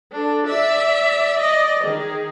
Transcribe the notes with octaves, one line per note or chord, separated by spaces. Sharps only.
D4 A4
D5 E5
D5 D#5
D#3 G#4